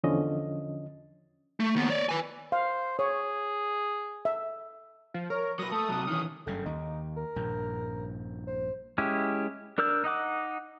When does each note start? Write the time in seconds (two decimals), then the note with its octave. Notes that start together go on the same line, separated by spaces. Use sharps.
0.04 E2 D3 F3 C#4 D#5
1.60 A3
1.76 D#2 B3
1.90 C#5 D5
2.09 B4 G#5
2.52 C5 F5
2.99 G#4 C#5
4.25 E5
5.14 F3
5.30 A#4 C#5
5.59 F#3 B4 D#6 A#6
5.72 A3 A5
5.88 C3 F#3
6.08 D#3 E3 C#4
6.46 F#1 G2 C#3 A3
6.66 D#2 D#4
7.17 A#4
7.36 A#1 G2
8.47 C5
8.98 G#3 C#4 E4 G4
9.78 D4 A#4 D5 E6 G6
10.04 D#4 D#5 F#5 D6